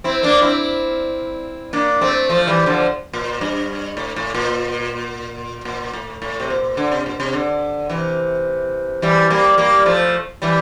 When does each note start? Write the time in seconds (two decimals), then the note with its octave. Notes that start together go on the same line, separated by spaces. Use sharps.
0.04 C4 E4
0.23 A#3 D4
0.42 C4 E4
1.73 A#3 D4
2.01 A3 C4
2.29 F3 A3
2.47 E3 G3
2.66 D3 F3
3.13 A#2
3.41 G2
3.97 A2
4.16 A2
4.34 A#2
5.65 A#2
5.93 A2
6.22 A2
6.40 C3
6.50 A#2
6.77 D3
6.92 C3
7.06 A#2
7.20 C3
7.33 D3
7.89 C3 E3
9.02 E3 G3
9.30 G3 A#3
9.58 G3 A#3
9.86 F3 A3
10.42 E3 G3